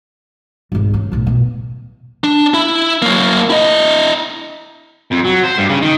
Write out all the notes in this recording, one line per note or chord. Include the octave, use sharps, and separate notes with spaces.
G#1 C#2
C#3
B1 A2
B2
D4
E4
F#3 A#3
E4 D#5
F2
F#3
C5
G2
C#3
D#3